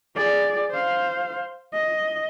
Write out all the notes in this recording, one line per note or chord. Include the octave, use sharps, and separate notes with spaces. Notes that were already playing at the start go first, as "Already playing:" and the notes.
G#4 D5
C5 F5
D#5